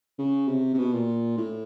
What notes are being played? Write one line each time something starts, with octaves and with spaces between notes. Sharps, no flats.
C#3
C3
C3
B2
A#2
A2